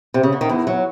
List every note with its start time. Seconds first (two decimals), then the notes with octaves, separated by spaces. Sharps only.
0.14 C3
0.23 C#3
0.32 D3
0.41 D#3
0.49 E2 E3
0.67 F#3